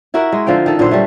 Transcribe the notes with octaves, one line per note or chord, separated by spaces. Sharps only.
E4 F#4 A#4 E5
G#3
D3 F3 F5 G5
D#3 A4
A#2 D3 F#3 C5
D3 G3 A3